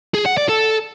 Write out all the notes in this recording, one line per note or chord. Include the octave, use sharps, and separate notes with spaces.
G#4
F#5
D5
A4